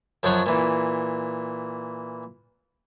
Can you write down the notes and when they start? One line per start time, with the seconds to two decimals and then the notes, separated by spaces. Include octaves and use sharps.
0.23 F#2 F3 F#3 C#5 F#5 C#6
0.46 A#2 E3